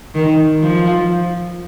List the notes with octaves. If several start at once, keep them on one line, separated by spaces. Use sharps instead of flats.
D#3
F3